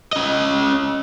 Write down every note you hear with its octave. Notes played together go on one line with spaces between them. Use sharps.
C#4 D#5